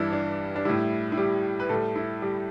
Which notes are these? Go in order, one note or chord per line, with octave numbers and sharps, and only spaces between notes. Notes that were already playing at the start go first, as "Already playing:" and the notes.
Already playing: G2 E3 G3 D4 E4
D4
D4
A2 G3 E4
E4
G3 G4
B4
A2 G3 A3 A4
E4
G3 G4